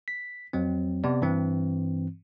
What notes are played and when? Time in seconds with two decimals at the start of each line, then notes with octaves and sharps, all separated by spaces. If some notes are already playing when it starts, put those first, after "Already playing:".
0.08 B6
0.53 F2 F#3 C4
1.04 C3 B3 D5
1.22 G2 E3 C4